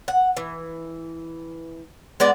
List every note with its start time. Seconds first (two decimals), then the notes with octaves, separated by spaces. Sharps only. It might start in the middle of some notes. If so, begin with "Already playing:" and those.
0.08 F#5
0.37 E3
2.20 G#3 B3 D5